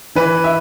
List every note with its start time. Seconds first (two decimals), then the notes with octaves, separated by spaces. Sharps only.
0.15 E3 B4
0.44 E5